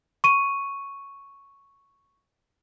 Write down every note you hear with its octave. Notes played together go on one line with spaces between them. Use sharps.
C#6 D#7